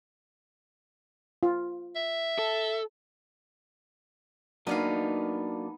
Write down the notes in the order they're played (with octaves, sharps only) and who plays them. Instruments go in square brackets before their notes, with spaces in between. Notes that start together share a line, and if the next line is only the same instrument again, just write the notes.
[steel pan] F4
[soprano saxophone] E5
[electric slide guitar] A4
[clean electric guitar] F#3 A#3 D4 [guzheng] B3 D#4 F5